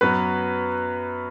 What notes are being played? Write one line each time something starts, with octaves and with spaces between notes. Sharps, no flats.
F#2 F#3 B3 B4